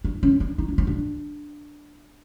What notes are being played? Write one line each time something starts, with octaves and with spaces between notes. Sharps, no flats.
D4
C#4
D4
D#4
D4
C#4
D4